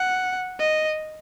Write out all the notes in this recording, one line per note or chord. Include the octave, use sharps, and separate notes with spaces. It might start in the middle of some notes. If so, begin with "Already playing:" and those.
Already playing: F#5
D#5